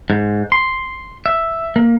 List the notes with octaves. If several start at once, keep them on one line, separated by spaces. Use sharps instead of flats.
G#2
C6
E5
A#3